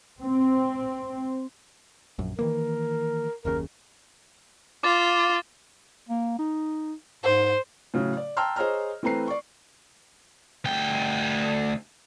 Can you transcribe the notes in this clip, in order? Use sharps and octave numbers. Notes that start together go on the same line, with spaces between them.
C4
A#1 F#2
D#3 E3 A#3 A#4
F#1 D#2 C#3 A#4
F4 D6 A6
A#3
D#4
G#2 C5
A2 C#3 F#3
D5
G5 A5 A#5 C6 E6 F6
G#4 C5 C#5 D#5 A#5 F6
E3 A3 C4 B4 A#5 C7
D5 C#6
D2 G5